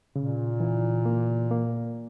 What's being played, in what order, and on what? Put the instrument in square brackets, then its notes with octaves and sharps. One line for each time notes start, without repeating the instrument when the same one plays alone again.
[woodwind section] A#2 [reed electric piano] C#3
[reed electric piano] E3
A#3
A#3